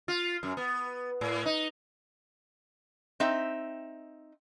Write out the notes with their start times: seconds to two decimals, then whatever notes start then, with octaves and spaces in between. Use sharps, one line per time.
0.08 F4
0.43 F#2
0.57 B3
1.21 A2
1.45 D#4
3.20 C4 D#4 E5